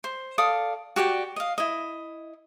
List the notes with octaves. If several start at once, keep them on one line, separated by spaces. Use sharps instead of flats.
C5
A4 D5 F5 D#6
F#4 G4 D5 G5
D#5 F5
E4 D#5